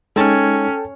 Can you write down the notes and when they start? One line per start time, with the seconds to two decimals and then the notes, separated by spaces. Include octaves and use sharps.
0.16 G#3 C#4 D#4 A4 G5 A5 G#6